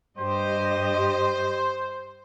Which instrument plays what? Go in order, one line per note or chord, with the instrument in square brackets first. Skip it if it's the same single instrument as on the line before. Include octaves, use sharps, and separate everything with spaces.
[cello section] G2 G4 D#5 [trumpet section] C5